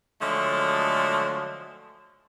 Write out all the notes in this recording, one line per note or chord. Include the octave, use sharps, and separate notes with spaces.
D3 F3 F#3 G#3 A3